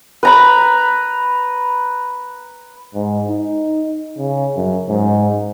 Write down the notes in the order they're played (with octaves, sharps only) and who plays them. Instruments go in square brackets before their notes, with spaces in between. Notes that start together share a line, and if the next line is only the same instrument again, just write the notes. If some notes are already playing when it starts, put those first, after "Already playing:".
[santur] B4 A#5 B5
[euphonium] G#2
D#4
C#3
F#2
G#2